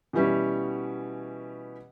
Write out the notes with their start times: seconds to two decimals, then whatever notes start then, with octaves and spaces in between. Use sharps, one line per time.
0.13 B2 E3 G3 C#4